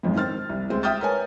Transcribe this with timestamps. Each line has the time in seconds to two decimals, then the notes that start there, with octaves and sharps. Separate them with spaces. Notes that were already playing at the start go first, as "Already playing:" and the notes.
0.03 B1 F2 G#2
0.15 D#3 C4 F6 A6
0.49 C2
0.70 D2 G#3 C4
0.83 E5 G5 D#6 F6 G6 A6
1.01 A#4 B4 C#5 G#5